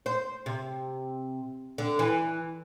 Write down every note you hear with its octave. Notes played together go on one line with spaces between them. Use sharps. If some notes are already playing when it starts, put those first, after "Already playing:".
C5
C3
D3
E3